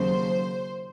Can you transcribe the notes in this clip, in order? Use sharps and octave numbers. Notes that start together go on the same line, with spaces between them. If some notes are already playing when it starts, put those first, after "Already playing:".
Already playing: D#2 C#3 F#3 C5